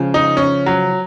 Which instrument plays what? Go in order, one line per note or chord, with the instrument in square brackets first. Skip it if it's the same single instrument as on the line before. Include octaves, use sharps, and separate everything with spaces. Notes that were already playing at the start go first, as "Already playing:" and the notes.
Already playing: [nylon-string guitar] C#3 F3 G#3
[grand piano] D#4
C#4
F#3